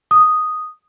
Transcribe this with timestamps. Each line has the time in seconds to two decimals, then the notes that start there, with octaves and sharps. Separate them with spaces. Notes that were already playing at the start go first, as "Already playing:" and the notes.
0.11 D#6